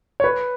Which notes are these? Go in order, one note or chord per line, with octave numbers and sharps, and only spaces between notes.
C#5
B4